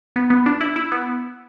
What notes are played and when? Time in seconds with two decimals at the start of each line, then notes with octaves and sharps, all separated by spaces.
0.16 B3
0.30 B3
0.46 D4
0.61 E4
0.76 E4
0.92 B3